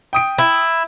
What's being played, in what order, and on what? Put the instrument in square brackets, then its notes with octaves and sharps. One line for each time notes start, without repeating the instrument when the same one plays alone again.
[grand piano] G5 D#6 D7
[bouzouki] E4